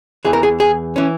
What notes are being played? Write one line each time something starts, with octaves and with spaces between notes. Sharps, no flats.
E2 E3 G#4
A#4
G#4
G#4
E3 C#4